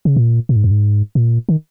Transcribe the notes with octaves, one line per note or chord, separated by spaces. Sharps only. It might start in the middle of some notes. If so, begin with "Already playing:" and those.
C#3
A#2
A#2
G#2
F#2
G#2
A#2
D#3